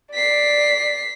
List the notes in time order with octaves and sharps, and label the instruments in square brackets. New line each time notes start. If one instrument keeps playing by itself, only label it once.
[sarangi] D5 [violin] B6 C7